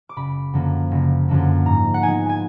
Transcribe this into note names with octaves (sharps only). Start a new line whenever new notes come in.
D6
F#1 B5
F#2 D3 F3 A#3
F#1
F#2 D3 F3 A#3
G#2 A#5
F#5
F3 G#3 B3 D#4 G#5
G#5